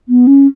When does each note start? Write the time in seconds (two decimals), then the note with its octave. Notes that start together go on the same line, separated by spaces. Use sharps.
0.08 B3
0.27 C#4